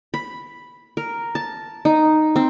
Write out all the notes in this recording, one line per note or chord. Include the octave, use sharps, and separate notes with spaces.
B5
A#4
A5
D#4
C4